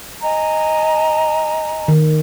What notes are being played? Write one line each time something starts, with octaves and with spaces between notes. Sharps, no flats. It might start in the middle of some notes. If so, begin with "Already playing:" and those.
D#5 G#5 A#5
D#3